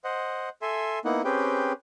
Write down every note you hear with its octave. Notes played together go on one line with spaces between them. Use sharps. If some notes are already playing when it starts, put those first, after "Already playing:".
C5 D#5 F#5
A4 E5 G#5 C6
A#3 B3 D#4 E4 F#5
C4 C#4 G4 G#4 B4 G5